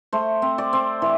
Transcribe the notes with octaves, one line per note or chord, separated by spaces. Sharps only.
A3 C5
C4
D5
C4
E3